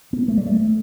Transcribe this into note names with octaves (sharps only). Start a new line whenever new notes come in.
B3
A3
G3
A3